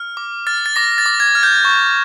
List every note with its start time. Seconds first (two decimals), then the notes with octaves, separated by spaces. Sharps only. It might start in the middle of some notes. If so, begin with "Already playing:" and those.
Already playing: F6
0.17 D6
0.47 F6 A6
0.66 A6
0.76 D6 A#6
0.98 A6
1.06 D6
1.20 G#6
1.35 F6
1.43 G6
1.65 C#6